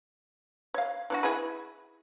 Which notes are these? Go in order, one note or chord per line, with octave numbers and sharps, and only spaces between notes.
C#5 F5
E3 D4 F#4
E4 G#4 B4